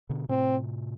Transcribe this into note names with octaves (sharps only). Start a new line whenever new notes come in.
B2 D3
A2 C3 C4